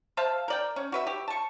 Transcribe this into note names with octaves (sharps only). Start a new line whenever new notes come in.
C5 E5 F5 A5
A#4 D5 G5
C#4
F#4 B4 E5
G4
A5 C#6